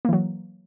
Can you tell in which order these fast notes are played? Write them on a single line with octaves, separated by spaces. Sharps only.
A#3 E3 F#3